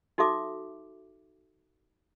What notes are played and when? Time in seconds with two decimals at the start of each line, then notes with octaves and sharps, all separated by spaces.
0.18 D#4 F#4 A4 E5 D6